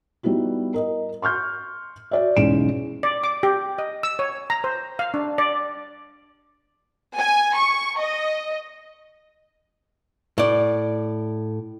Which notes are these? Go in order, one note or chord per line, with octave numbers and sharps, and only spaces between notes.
G3 B3 D#4 E4 F#4
A#4 D#5
C6 C#6 F6 G6
F#4 D5 E5
B1 E2 G#3 C#4 D7 E7
D5
D6
G4
D#5
E6
C#5
A#5
C5
F5
D4
D5
G#5
C#6
D#5
A2 D5